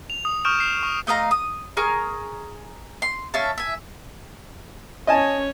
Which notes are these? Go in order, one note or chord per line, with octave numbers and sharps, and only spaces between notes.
F7
D#6
C#6 D#6 F6 G6 D7 E7
C7 E7
C#6
A3 D#5 F5 A#5
D#6
G#4 A#4 C#6 F6
C6
C#4 E5 F5 A5
E5 G#5
C#4 C#5 D#5 G#5 A5